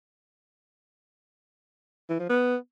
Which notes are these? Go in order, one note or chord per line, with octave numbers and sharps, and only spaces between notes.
E3
F3
B3